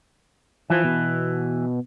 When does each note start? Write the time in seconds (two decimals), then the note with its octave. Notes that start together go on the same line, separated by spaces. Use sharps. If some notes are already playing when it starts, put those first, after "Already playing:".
0.70 E3 F3
0.84 B2